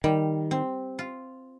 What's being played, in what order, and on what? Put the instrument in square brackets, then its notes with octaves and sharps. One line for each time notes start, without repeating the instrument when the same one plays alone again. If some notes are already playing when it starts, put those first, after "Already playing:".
[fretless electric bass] D#3 [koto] G3
[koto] C4
F4